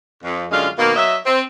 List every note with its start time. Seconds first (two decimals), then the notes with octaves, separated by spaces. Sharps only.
0.24 F2
0.51 F#2 D3 G#3 F4 F5
0.78 B2 D#3 A#3
0.96 F#3 D#5 E5
1.26 C4